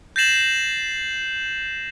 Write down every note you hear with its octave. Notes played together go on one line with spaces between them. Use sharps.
G6 A6 A#6 C7 E7 F#7